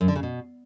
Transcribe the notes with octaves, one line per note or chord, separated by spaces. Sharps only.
F#2
D3
C#3
B2